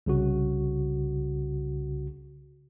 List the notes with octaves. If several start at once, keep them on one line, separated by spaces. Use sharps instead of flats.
C2 C#3 F#4